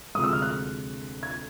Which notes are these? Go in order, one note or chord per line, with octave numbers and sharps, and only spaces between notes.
D2 C3 F3 G#3 D#6
E6
F6
F#6
G#6